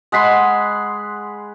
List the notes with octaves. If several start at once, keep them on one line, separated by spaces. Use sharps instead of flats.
G#3 F#5 B5 C6